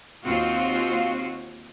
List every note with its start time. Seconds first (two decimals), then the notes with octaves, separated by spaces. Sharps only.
0.25 D#2 C4 F4 F#4